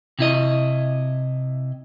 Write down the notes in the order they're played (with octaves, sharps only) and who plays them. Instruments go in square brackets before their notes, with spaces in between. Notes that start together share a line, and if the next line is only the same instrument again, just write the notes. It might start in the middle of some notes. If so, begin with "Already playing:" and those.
[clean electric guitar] C3 E4 D#5